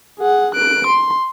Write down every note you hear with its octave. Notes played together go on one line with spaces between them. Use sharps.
G#4 F#5
F#6 D7
C6